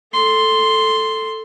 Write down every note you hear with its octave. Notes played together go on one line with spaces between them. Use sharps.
A4 C6